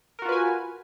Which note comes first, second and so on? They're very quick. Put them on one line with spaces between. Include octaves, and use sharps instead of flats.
A#4 F#4 F4 B4 G#5